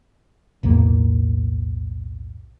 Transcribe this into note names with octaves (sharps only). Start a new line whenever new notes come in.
B1 E2 A2 A#3